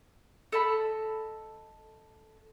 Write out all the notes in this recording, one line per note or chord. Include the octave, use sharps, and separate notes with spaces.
A4 D#5 A5 B5